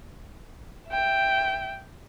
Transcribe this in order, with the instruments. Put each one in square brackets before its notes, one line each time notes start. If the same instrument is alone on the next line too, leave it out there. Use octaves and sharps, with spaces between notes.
[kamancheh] E5 G5